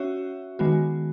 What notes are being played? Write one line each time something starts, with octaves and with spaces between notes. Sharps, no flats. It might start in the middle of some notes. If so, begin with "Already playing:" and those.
Already playing: C#4 F#4 C#5 E5
D#3 G#3 B3 F#4